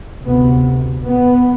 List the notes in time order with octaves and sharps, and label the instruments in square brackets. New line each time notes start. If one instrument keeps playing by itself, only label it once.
[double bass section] D2 C3 B3
B3